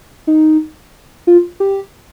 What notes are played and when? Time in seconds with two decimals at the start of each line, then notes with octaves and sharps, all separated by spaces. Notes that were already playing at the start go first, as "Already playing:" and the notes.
0.27 D#4
1.27 F4
1.60 G4